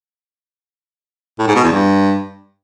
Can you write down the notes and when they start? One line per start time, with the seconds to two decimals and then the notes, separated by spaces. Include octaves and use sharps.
1.39 A2
1.47 G#2
1.55 B2
1.64 E2
1.72 G2